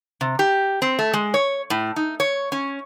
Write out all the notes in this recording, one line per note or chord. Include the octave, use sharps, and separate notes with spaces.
C3
G4
C4
A3
G#3
C#5
A2
D#4
C#5
C#4